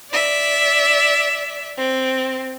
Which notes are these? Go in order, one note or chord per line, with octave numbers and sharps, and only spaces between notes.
D5 E5
C4